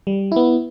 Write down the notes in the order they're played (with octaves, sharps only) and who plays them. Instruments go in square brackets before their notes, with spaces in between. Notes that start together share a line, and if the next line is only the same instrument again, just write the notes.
[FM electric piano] G3
B3 E4